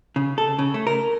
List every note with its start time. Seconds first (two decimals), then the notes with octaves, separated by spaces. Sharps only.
0.16 C#3
0.38 A4
0.59 C#3
0.74 A3
0.87 A#4